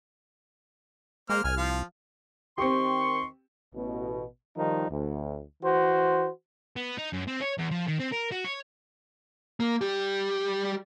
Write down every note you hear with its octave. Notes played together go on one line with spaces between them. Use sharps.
G#3 A#3 C5 F6
C2 G#5 F6
F3 F5
D#3 C4 G4 C6 C#6
A1 B2
D#3 F3 G3 D#4
D2
E3 F#4 C5
B3
D#4
F#2
C4
C#5
E2
F3
D#3
C4
A#4
F#4
C#5
A#3
G3 G4